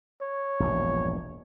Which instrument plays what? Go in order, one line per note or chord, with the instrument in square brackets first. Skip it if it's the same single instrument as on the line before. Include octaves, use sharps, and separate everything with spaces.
[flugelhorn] C#5
[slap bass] E1 A#1 G2